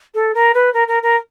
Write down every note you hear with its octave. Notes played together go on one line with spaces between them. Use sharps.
A4
A#4
B4
A#4
A#4
A#4